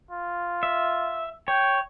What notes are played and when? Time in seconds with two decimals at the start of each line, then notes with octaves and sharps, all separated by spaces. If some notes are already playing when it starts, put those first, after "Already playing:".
0.11 F4
0.63 E5
1.48 C#5 G5